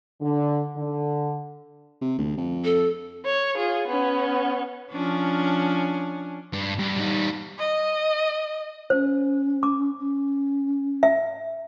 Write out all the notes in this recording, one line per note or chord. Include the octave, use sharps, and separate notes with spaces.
D3
D3
C3
D2
F2
A4
C#5
F4 G#4
B3 C#4
F3 C#4 D4
G2
G2
G3 D#4
D#5
C#4 C5
D6
C#4
E5